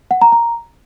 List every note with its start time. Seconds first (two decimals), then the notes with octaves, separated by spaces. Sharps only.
0.11 F#5
0.22 A#5
0.32 A#5